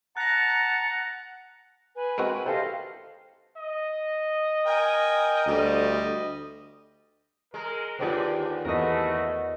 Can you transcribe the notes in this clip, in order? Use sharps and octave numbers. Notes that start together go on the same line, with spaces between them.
F#5 A5 A#5 F#6 A#6
B4 G#5
G#3 C4 F#4 A#4
G4 A4 C5 D#5 F5
D#5
A#4 G5 G#5
D2 G3
G#3 A#4
D#2 D3 F4 G#4 B4 C5 D5 G5
E2 A3 E4 F#4 A#4 B4 D#5